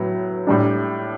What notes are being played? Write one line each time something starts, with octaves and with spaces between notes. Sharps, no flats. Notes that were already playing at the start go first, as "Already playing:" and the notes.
Already playing: A2 F#3 B3
A2 G3 D4